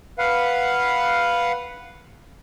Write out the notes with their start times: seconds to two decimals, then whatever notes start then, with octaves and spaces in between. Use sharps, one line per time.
0.19 B4 F5 F#5